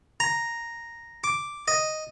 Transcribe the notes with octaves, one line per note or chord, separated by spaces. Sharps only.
A#5
D6
D#5